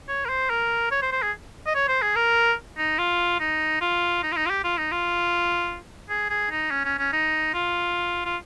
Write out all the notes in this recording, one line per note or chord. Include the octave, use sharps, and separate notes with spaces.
C#5
A#4
C5
A#4
C#5
C5
C5
G#4
D#5
C#5
C5
G#4
A#4
D#4
F4
D#4
F4
D#4
F4
D#4
F4
G4
F4
D#4
F4
G#4
G#4
D#4
C#4
C#4
C#4
D#4
F4
F4